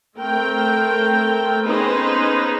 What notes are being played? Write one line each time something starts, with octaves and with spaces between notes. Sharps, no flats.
A3 C4 A#4 G5
B3 C#4 D#4 G#4 B4 C5